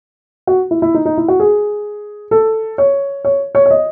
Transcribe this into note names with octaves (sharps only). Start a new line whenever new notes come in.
F#4
E4
E4
D#4
D#4
E4
F#4
G#4
A4
C#5
C#5
C#5
C#5
D#5